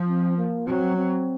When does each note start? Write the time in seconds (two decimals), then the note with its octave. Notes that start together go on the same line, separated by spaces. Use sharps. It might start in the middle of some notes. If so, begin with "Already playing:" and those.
Already playing: F3
0.08 C4
0.38 A#3
0.67 F#3 C4
0.97 C4